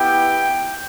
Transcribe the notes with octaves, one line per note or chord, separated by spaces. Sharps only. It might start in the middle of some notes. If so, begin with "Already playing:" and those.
Already playing: B3 E4 G4 G5